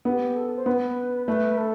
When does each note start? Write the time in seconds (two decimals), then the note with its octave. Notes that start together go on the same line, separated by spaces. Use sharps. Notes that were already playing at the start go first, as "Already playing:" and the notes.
0.05 B3 A4
0.09 G4
0.36 A4
0.56 C5
0.66 B3 B4
1.27 A3 B4
1.58 A4